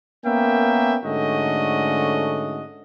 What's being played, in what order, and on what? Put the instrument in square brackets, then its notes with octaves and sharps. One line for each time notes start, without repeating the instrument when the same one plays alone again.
[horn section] A#3 B3 C#4 A#4 E5 G5
G#2 D3 A3 C#4 F#4 D#5